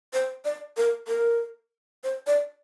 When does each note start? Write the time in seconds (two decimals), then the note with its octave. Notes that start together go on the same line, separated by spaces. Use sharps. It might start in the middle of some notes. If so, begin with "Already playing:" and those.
0.13 C5
0.45 D5
0.77 A#4
1.08 A#4
2.04 C5
2.27 D5